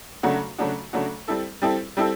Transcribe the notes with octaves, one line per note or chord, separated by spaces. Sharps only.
C#3 F#3 A3 D4 F#4
C#3 F#3 A3 D4 F#4
C#3 F#3 A3 D4 F#4
G3 C4 E4 A4
G3 C4 E4 A4
G3 C4 E4 A4